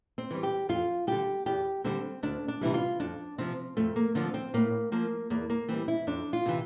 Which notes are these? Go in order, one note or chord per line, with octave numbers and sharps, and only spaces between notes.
C4
E3 G3
G4
F2 F4
D3 G3 G4
E2 G4
D3 G3 C4
D2 D4
D4
C3 E3 G3 E4
F4
F2 D4
C3 F3 C4
F2 A3
A#3
D3 F3 C4
C4
A2 A#3
F3 A#3
E2 A#3
A#3
E3 G3 C4
E4
F2 D4
F4
C3 E3